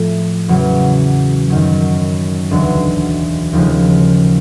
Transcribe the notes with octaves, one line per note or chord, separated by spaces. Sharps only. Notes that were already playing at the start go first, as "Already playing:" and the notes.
Already playing: A2 F3 A3
E2 C#3 F#3
F#2 D#3 F#3
E1 D2 D3 F#3
D#2 C#3 F3 G#3